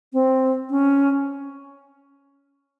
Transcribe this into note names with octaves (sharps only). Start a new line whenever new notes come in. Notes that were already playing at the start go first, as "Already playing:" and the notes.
C4
C#4